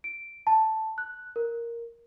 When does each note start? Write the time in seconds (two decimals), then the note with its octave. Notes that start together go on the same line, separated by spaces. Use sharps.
0.04 D7
0.47 A5
0.98 F#6
1.36 A#4